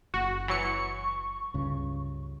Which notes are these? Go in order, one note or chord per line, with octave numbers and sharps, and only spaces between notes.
F#1 F#4
E3 F#3 C#6 C#7
C#2 G2 C#3